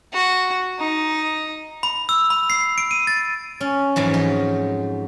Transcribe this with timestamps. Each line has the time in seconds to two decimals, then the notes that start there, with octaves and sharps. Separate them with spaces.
0.13 F#4
0.80 D#4
1.83 B5
2.09 E6
2.30 B5
2.50 C7
2.78 D7
2.91 D#7
3.07 A6
3.61 C#4
3.96 F2 G#2 E3 F#3
4.14 D#4